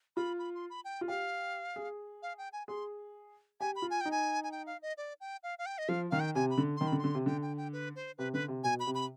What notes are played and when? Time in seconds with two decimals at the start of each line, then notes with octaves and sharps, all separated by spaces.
0.16 F4 B5
0.39 B5
0.55 C6
0.70 B5
0.85 G5
1.01 F4
1.08 G4 F5
1.76 G#4
2.23 F5
2.38 G5
2.53 G#5
2.68 G#4 C6
3.60 G4 G#5
3.76 B5
3.82 F4
3.90 G#5
4.01 D#4 G5
4.11 G#5
4.44 G#5
4.52 G5
4.67 F5
4.82 D#5
4.97 D5
5.21 G5
5.43 F5
5.59 F5
5.66 G5
5.78 D#5
5.88 F3 F5
6.11 D#3 F5
6.20 G5
6.35 C3 G#5
6.50 B5
6.58 D3
6.77 D#3 C6
6.88 D3 B5
6.99 C6
7.04 D3
7.15 C3
7.26 D3 G5
7.42 G5
7.57 G5
7.73 B4
7.96 C5
8.18 C3 B4
8.33 D3 B4
8.48 C3
8.64 B2 G#5
8.80 B5
8.87 C3
8.95 B5